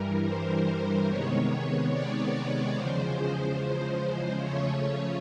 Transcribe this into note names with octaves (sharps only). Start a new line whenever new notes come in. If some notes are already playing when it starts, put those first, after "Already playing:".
Already playing: G2 E3 G3 A#4
C5
C3 D#3 G#3 B3 C#5
D5
E2 C#3 F3 G#3 C5
C#3 F3 A3 C#4 C#5